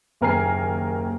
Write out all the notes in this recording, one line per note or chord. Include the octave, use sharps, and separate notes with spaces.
F#1 D#2 A#4 G#5 A#5 C7